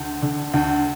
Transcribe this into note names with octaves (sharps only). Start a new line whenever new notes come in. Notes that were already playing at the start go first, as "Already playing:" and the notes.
Already playing: D2
D3
D2